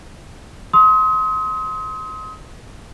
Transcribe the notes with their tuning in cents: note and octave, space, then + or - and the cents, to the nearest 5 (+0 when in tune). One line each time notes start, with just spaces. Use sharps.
C6 +0 D#6 +35